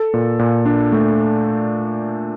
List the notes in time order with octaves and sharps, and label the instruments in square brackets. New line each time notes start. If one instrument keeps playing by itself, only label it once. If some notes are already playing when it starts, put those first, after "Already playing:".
Already playing: [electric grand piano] A4
A#2
A#2
D4
A3